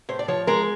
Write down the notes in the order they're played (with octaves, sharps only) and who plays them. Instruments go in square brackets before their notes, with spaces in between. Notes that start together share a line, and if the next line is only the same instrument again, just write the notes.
[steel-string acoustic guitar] A2 C5
D5
F3 C#5
G#3 A#4